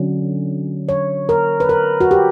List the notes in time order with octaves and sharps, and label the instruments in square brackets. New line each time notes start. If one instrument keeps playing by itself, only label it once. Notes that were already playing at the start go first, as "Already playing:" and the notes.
Already playing: [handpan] D3 F#3 C#4
C#5
A#4
B4
A#4
F#4
G4